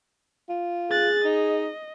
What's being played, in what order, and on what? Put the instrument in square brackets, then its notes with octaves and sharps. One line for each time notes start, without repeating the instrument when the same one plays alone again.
[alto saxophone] F4
[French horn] G#4 [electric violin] F#6 A6
[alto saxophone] D#4 [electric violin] D#5